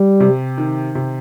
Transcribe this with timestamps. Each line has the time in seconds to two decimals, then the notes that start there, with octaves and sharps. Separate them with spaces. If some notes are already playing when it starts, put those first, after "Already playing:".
Already playing: G3
0.20 C3
0.58 D#3
0.95 C3